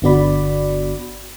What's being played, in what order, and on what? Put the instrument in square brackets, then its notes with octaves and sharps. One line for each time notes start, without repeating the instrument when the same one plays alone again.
[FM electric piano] G1 D3 B3 F#4 D5 B5